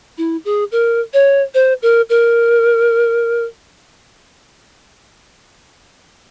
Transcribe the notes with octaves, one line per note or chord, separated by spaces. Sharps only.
E4
G#4
A#4
C#5
C5
A#4
A#4